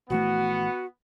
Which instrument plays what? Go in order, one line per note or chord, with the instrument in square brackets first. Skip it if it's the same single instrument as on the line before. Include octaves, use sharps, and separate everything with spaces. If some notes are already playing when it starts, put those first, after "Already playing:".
[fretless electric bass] A#1 E3 A3 [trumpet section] B3 [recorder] F#4